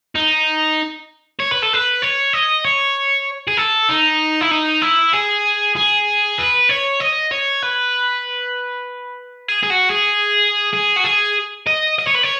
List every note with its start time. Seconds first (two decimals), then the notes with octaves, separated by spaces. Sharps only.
0.15 D#4
1.39 C#5
1.51 B4
1.62 A4
1.73 B4
2.02 C#5
2.33 D#5
2.64 C#5
3.48 G#4
3.57 A4
3.89 D#4
4.41 E4
4.51 D#4
4.82 E4
5.13 G#4
5.76 G#4
6.38 B4
6.69 C#5
7.00 D#5
7.31 C#5
7.62 B4
9.49 G#4
9.63 G#4
9.70 F#4
9.91 G#4
10.73 G#4
10.97 F#4
11.05 G#4
11.67 D#5
11.98 D#5
12.07 C#5
12.15 B4
12.23 C#5